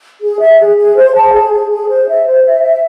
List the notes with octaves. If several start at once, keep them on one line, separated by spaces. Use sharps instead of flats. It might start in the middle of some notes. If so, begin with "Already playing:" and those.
G#4
E5
G#4
G#4
C5
A5
G#4
G#4
G#4
C5
E5
C5
E5
E5